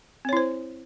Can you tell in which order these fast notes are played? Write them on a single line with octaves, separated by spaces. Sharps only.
C4 C#5 E4 C5